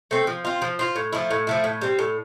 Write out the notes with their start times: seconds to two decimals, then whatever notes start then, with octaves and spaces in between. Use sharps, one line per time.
0.11 A3 C4
0.27 F3
0.45 C4 F4
0.62 F3
0.79 C4 F4
0.96 A2
1.12 F3 A3 E4
1.31 A2
1.47 F3 A3 E4
1.64 A2
1.81 G3 C4
1.99 A2